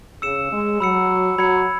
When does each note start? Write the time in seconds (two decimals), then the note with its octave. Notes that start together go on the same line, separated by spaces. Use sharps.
0.22 C#3 E6 C#7 E7
0.51 G#3
0.80 F#3 B5 E6 C#7
1.38 F#3 B5 G#6 C#7